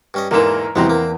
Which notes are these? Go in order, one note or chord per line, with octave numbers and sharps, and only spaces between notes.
G2 C#4 D#5
E2 G#2 D3 E3 A#3 A#4 E7
B1 E2 C3 E3 G#3 B3 C4 A#5
A#3